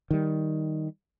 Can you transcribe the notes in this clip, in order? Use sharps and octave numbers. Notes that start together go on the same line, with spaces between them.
D#3 G3